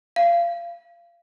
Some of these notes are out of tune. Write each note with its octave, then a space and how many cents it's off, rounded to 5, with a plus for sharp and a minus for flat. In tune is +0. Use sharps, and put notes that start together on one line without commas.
F5 -25